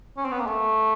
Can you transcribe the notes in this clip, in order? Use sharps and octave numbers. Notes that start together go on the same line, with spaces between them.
C#4
C4
B3
A#3
A3